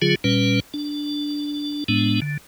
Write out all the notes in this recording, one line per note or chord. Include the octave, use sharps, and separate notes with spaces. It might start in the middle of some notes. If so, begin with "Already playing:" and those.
D3 F#3 F4 G#4
A#2 G3 C#4 B4
D4
A2 G#3 B3 D4
D3